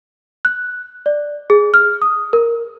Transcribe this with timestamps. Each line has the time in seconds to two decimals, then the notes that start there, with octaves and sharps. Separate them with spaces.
0.45 F#6
1.06 D5
1.50 G#4
1.74 F6
2.02 D#6
2.33 A#4